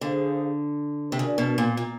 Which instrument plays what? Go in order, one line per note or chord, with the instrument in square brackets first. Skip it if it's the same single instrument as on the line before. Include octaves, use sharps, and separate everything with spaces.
[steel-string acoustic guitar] D3 [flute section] G#4 C5 F5
[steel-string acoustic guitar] C3
[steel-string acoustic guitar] C#3 [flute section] D4 F#4 A#4 D5
[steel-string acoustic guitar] B2
A#2
A#2